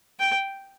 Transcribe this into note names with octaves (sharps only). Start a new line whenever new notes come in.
G5